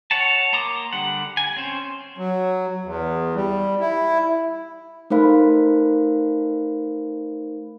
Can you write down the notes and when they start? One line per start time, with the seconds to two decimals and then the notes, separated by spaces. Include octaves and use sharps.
0.11 C#5 F#5 A5
0.53 A#3 A#5 C6 D6 D#6
0.93 D3 G3 F#5
1.37 G#5
1.57 C4 C#4 C5
2.17 F#3
2.85 E2
3.35 G3
3.80 E4
5.10 A3 D#4 A#4 C5 F5 B5